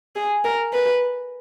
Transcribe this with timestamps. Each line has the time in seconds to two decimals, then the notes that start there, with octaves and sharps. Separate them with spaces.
0.16 G#4
0.44 A#4
0.73 B4